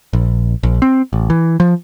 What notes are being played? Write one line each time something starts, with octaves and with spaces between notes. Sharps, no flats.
A#1
A#1
C4
A1
E3
F3